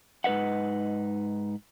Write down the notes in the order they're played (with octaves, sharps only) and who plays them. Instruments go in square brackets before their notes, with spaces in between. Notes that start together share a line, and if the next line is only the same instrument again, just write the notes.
[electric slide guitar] G#2 D#4 B4 E5 F#5